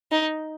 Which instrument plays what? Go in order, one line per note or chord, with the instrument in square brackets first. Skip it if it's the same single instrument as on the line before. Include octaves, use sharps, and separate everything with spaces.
[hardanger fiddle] D#4